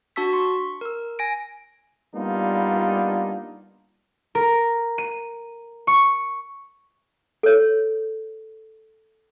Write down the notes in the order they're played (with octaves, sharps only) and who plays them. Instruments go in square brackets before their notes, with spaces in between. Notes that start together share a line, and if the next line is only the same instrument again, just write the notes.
[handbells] D4 F#4 A5 C#6 E6 B6
C6 C#6
A#4 E6
G#5 A#6 D7
[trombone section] G3 A#3 B3 D4 D#4 F4
[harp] A#4
D#7
C#6
[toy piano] A4 C#5